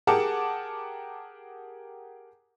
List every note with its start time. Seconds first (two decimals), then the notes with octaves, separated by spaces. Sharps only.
0.07 G4 G#4 A#4 F#5 A5 D6